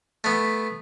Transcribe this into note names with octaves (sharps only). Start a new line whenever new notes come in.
A3 B3